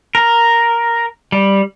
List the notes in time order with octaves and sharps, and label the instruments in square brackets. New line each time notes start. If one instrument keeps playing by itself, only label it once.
[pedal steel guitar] A#4
G3